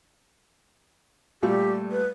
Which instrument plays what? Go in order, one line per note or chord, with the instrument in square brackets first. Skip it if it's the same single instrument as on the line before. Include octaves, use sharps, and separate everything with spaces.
[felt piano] A#2 G3 A3 [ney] G4
[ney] B4